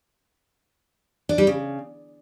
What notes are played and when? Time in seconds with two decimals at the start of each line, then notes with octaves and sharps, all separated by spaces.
1.29 D4
1.38 G3
1.47 C#3